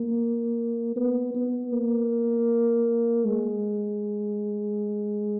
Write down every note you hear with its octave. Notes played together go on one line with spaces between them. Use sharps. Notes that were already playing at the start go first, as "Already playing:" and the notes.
Already playing: A#3
B3
B3
A#3
G#3